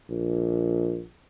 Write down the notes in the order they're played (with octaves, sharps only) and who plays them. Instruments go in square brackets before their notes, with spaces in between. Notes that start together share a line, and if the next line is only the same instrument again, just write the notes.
[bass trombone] A#1